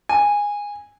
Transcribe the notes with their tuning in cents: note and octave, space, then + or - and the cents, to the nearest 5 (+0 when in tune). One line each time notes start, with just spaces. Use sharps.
G#5 -15